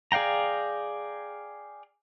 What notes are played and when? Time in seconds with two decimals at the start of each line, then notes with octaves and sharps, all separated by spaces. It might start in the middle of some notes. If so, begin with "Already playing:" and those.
0.12 G#4 D5 F5 G5 A#5